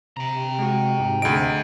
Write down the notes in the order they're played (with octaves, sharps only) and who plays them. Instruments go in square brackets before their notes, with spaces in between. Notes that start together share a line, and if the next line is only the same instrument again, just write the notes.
[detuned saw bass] C3 [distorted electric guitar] G5 A#5
[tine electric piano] G#3 F#4
G#2
[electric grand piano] D2 D7 [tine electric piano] G#4 D#5